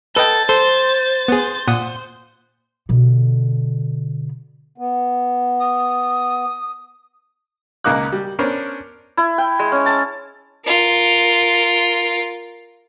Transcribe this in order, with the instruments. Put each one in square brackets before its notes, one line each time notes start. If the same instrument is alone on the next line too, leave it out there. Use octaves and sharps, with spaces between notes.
[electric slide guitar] A4 [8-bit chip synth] B4 D#5 G5 [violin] A6
[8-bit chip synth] A4 [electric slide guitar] C5
[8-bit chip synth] B3 G#4
A#2 F#5 D#6
[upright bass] B2 D3
[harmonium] B3
[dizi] D#6
[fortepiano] C#2 C#3 A#3 D#4 D6 F#6
G3
B3 C#4 D4 A#4 C5 C#5
[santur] E4
G5
G#3
C#4
A5
[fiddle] F4 A#4